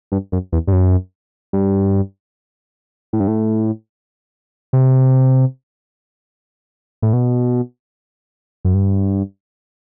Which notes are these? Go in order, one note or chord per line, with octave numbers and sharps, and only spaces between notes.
G2
F#2
E2
G2
F#2
G2
A2
G2
A2
C3
A2
B2
F#2
G2